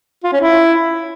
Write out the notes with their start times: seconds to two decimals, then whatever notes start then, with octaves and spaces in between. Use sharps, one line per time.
0.24 F4
0.32 C#4
0.41 E4